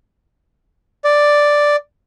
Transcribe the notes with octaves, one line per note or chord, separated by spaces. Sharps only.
D5